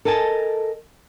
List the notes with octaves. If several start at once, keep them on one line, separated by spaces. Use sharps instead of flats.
A4 A#4 D#5 G#5 A5